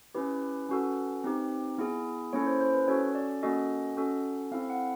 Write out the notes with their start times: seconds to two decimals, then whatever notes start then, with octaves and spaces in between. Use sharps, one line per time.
0.14 C#4 E4 G4 B4
0.69 C#4 F#4 A4
1.24 C4 D#4 G4
1.78 B3 E4 G#4
2.33 A#3 C#4 E4 A4 C#5
2.46 C5
2.61 C5
2.74 B4
2.88 C#4 F#4 A4 C#5
3.15 D5
3.43 A#3 C#4 F#4 A4 D#5
3.97 C#4 F#4 A4
4.51 C4 E4 A4 F5
4.70 F#5